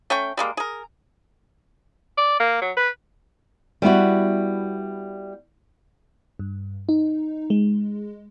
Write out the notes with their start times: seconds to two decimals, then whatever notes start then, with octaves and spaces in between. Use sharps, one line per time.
0.10 A3 C#4 G5 C#6
0.37 G3 G#3 A#3
0.57 G#4 A#4
2.17 D5
2.40 A#3
2.61 F#3
2.77 B4
3.82 G3 B3 E4 F#4
6.39 G2
6.89 D#4
7.50 G#3